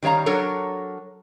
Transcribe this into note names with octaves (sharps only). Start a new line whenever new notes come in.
D#3 G3 C#5 F5 A#5
F#3 D4 A4 A#4 C#5